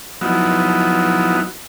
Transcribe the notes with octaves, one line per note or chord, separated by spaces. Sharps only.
F3 F#3 B3 D#4 E4 F#4